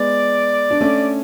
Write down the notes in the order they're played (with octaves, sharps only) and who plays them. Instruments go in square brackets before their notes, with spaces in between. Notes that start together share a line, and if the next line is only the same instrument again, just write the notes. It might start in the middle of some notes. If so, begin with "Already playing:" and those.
Already playing: [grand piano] G#3 B3 [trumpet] D5
[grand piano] D4
A3 C#4